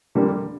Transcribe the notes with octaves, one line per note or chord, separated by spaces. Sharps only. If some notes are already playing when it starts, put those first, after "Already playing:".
F2 D3 G3 A#3